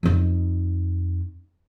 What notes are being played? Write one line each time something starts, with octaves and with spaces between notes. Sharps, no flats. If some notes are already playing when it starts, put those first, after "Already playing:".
F2 D#4